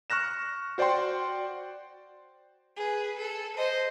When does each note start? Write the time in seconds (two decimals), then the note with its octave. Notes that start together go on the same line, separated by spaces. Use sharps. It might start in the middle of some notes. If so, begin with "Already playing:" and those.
0.10 C#6 F6 F#6 A#6 E7
0.78 F#4 C5 D5 F#5 G5 C6
2.76 G#4 B4
3.19 A4
3.57 C5 D#5